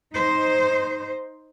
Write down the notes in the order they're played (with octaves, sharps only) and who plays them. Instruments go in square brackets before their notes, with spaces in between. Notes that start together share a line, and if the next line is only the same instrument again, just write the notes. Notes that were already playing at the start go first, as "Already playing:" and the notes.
[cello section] D#4 C5